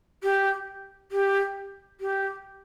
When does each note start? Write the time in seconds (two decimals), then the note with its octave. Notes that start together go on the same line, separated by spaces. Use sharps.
0.23 G4
1.12 G4
2.01 G4